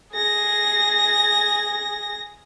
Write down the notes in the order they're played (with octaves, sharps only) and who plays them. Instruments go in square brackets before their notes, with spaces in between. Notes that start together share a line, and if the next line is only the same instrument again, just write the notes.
[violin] G#4 A#6